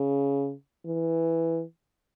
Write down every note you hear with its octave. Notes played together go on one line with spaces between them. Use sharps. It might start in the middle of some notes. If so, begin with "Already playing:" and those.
Already playing: C#3
E3